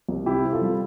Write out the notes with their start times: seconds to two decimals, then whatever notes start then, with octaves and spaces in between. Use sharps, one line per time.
0.09 C2
0.26 C3 E4 G4
0.44 C4
0.53 F4 A4
0.62 G3